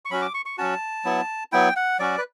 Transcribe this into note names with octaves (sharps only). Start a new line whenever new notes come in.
C#6
F#3 C#4 F#4 B5
D6
C#6
C#6
F#3 C#4 F#4 A5
F#3 B3 E4
F#3 B3 E4 G5
F#5
F#3 C#4 F#4 D5
B4